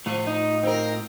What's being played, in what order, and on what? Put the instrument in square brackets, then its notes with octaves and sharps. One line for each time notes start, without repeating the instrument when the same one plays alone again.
[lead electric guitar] A2 F4 [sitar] F3
[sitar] D#4
C4 A#4